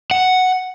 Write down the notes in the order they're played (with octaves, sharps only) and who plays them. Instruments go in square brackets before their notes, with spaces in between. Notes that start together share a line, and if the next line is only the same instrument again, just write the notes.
[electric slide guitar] F#5